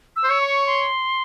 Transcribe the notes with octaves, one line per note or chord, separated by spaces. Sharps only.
E6
C5
C#5
C#6
C6